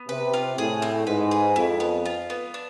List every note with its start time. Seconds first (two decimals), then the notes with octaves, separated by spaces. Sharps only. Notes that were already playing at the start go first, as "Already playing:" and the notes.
Already playing: B3
0.09 C3 B4
0.34 F4
0.58 A2 G#4
0.82 C4
1.07 G#2 B4
1.31 G#4
1.56 F2 E4
1.80 B3
2.05 F4
2.30 B3
2.54 D4